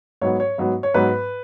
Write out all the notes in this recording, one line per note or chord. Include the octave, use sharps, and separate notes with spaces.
G#2 F#3 B3 C#5
C#5
G#2 F#3 B3
C#5
G#2 F#3 B3 B4